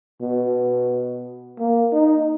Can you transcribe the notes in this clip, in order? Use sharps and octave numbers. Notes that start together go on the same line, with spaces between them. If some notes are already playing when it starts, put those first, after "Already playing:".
B2
A#3
D#4